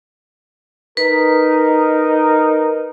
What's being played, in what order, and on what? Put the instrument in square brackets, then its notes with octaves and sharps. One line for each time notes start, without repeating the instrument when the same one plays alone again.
[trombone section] D#4 A#4 [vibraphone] B4